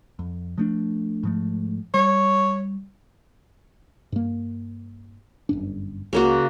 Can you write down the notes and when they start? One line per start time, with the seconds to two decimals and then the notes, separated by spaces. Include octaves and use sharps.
0.19 F2
0.58 F3 A3 D4
1.23 G#2 F3 A3
1.94 G3 C#5
4.12 G2 A#3
5.49 G1 F#2 D4
6.13 C#2 C#3 A#3 F#4